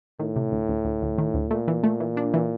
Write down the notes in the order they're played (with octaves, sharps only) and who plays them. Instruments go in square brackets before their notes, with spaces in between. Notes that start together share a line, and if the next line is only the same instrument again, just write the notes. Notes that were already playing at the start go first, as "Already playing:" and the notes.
[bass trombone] A2 [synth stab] D#3
[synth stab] C3
D2
D2
D2
D2
D#3
D2
[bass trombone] A#2 [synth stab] A3
[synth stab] E3
A3
E3
D4
E3